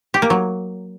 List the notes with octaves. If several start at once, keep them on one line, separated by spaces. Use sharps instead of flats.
G4
A#3
F#3